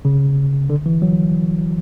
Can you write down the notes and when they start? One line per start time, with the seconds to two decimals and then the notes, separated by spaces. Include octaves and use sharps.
0.05 C#3
0.70 D3
0.86 E3
1.02 F#3